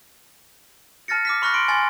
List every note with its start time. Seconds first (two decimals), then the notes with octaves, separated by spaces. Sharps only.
1.08 A5 F6 A6 A#6 C#7
1.25 D6 F6 B6
1.42 B5 C#6 F6 F#6 A#6 B6
1.54 C6 D7
1.68 G#5 C6 A6 F#7